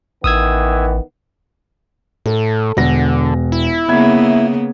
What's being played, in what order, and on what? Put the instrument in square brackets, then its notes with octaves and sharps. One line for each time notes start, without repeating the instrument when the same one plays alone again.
[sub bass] A1 [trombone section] D#3 E3 B3 [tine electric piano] D#6 E6 G#6
[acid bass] A2 [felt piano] A4
[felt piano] E1 F#5 A#6 [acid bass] D3
[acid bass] E4
[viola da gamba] C#3 A#3 B3 [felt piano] E5 G#6